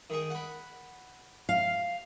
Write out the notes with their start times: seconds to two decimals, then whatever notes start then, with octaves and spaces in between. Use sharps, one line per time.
0.10 D#3 G#4
0.30 F#5 B5
1.49 F5